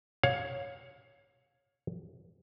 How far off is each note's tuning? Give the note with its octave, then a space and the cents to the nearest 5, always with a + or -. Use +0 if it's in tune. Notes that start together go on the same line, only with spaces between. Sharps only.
C#5 +0 F5 +25